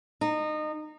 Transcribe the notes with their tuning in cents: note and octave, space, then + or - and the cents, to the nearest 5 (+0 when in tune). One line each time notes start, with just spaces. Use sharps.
D#4 -25